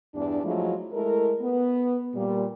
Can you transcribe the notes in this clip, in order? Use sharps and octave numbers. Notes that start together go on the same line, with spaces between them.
E2 G2 D4
F3 F#3 G#3 A3 E4 F4
G#3 A3 E4 A4 A#4
B3
A#2 G3